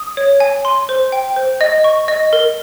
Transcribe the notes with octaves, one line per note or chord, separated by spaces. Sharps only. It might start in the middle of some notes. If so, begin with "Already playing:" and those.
Already playing: D#6
C#5
G#5
C6
C5
G5
C5
D#5
C#6
D#5
A#4